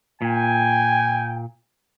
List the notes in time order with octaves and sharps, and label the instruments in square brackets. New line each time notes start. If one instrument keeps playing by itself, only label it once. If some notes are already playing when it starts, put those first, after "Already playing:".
[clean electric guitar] A#2 [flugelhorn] G5 [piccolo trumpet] G#5